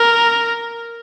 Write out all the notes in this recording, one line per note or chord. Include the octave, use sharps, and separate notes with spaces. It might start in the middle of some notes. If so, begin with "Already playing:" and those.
Already playing: A#4